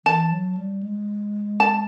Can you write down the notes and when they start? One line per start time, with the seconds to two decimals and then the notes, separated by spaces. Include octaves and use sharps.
0.05 E3 A5
0.32 F#3
0.57 G3
0.83 G#3
1.60 A5